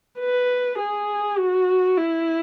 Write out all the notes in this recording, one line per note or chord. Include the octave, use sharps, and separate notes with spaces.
B4
G#4
F#4
E4